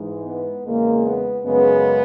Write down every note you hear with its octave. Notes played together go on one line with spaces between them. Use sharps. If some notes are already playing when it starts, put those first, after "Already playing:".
Already playing: G#2 E3 G#3
B3
E2 C#3 G#3 A#3
B3
F#2 C#3 G#3 B3